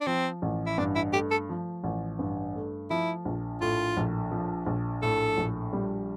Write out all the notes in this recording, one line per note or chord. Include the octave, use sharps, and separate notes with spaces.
D4
F3 C4
A1
E4
G2 D4
E4
A3 G4
A4
F3
A1
G2
A3
F3 E4
A#1
A2 F4
A#1
F3
A#1
A2 A4
A#1
G3